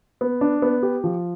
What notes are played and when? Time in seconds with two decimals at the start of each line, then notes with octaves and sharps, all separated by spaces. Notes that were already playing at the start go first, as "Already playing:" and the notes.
0.21 B3
0.41 D4
0.62 B3
0.83 G4
1.04 F3